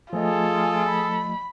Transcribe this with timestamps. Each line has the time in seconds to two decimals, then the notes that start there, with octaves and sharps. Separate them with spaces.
0.13 F3 A3 F4 G#4 A4 D#5
0.89 B5